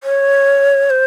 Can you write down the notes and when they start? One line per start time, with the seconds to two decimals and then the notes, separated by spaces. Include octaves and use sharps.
0.04 C#5
0.90 C5